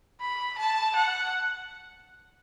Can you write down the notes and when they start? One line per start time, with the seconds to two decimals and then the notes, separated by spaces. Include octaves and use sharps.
0.21 B5
0.58 A5
0.96 F#5